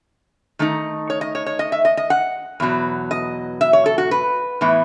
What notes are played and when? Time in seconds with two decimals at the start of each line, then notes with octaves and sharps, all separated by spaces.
0.59 D#3 A3 D#4
1.10 C#5
1.21 D#5
1.35 C#5
1.46 C#5
1.59 D#5
1.72 E5
1.85 D#5
1.97 D#5
2.10 F#5
2.60 E2 B2 F#3
3.11 D#5
3.61 E5
3.73 C#5
3.86 A4
3.98 F#4
4.11 B4
4.61 A2 E3 B3 E4